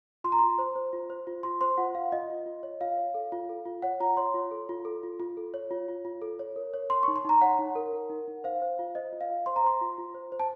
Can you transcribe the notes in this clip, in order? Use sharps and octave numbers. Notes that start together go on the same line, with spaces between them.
F4 C6
A#5
F4 C6
C5
C5
F4
C5
F4
F4 C6
C5 C6
F4 F#5
F4 F5
F4 D#5
F4
F4
C#5
F4 F5
C#5
A4
F4
A4
F4
C#5 F#5
F4 A#5
C#5 C6
F4
A4
F4
A4
F4
F4
A4
C#5
F4
F4
F4
A4
C#5
A#4
C#5
C#5 C6
D#4 C#6
C6
D#4 A#5
C#5 F#5
D#4
A#4
A#4
D#4
D#4
C5 F5
C5
F4
C5 D#5
F4
F5
F4
C5 C6
A#5
C5 C6
F4
F4
C5
C5
A5